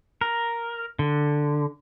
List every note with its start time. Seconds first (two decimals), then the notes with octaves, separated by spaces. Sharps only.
0.21 A#4
0.99 D3